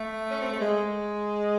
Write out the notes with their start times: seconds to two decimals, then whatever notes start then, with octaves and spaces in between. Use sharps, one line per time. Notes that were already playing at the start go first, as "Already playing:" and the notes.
Already playing: A3
0.31 C#4
0.41 C4
0.51 A3
0.61 G#3